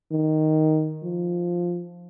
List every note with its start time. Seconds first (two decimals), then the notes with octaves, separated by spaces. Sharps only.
0.12 D#3
1.03 F3